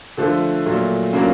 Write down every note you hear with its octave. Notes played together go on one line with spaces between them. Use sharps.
D3 F3 A3
A#2 F#3 A3
C#3 F#3 A#3 D4 F4